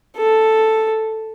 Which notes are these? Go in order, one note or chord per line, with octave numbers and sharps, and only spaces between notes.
A4